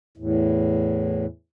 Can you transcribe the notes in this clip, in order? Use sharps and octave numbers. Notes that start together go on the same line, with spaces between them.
E2 A2